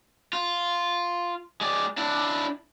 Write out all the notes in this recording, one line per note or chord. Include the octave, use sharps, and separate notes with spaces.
F4
G#3 D5
D4 E4